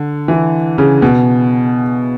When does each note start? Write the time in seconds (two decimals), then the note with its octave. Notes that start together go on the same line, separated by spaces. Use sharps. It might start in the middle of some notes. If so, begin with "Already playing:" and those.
Already playing: D3
0.28 E3
0.78 C#3
1.02 B2